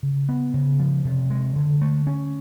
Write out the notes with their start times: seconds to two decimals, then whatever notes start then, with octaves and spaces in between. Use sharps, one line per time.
0.03 C#3
0.29 B3
0.54 C#3
0.80 F3
1.05 C3
1.30 G#3
1.56 D3
1.82 A3
2.07 C#4